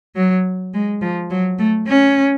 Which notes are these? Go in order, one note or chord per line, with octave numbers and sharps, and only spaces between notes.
F#3
G#3
F3
F#3
A3
C#4